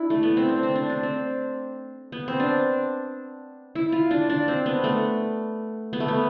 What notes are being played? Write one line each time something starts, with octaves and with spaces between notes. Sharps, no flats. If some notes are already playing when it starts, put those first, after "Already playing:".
Already playing: D4 E4
A3
B3
C4
D4
C4
D4
D4
C4
B3
C4
D4
E4
F4
D4
D4
C4
B3
A3
B3
A3
B3